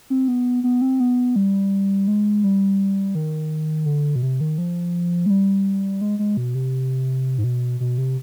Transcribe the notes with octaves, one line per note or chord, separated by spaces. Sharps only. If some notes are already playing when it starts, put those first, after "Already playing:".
C4
B3
B3
C4
B3
G3
G#3
G3
D#3
D3
B2
C3
D#3
F3
G#3
G3
G#3
G#3
B2
C3
G#2
B2
B2
C3